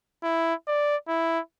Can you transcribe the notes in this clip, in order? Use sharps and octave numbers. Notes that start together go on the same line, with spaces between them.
E4
D5
E4